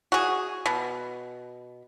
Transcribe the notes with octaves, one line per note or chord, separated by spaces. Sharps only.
F#4 G#4
B2